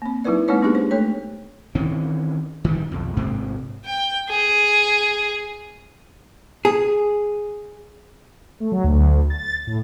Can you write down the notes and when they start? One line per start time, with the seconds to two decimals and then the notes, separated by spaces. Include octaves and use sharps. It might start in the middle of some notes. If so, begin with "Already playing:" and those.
0.02 A#3 C4
0.24 F#3 D#4 E4 A#4 B4 D5
0.48 G#3 A#3 C4 D#4 B4 C#5
0.62 G#3 B3 D4 D#4 G4 G#4
0.75 C5
0.91 A3 A4 C#5
1.75 D#3 E3 C4 C#4
2.64 D#3 F3 G3
2.91 B1 F2
3.17 A1 G#2 C3 C4
3.85 G5
4.30 G#4
6.65 G#4
8.60 A3
8.72 F#3
8.84 D2
9.30 A6
9.67 A2